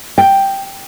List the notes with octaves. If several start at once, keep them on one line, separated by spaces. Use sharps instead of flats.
G5